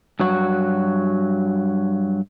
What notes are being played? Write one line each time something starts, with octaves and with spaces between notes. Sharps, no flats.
G2 F#3 F#4